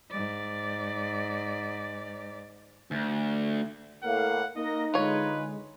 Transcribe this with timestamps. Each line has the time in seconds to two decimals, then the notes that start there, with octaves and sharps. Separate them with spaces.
0.11 G#2 D5
2.91 D2
4.03 A2 A#3 F5 F#5
4.56 A#3 D#4 A#4 D#5 A#6
4.94 D3 G#3 F4 B4 C#5